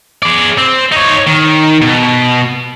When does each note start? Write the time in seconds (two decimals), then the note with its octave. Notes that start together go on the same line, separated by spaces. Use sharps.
0.23 G#4 D5
0.58 C4
0.92 D#4 C#5
1.27 D#3
1.82 B2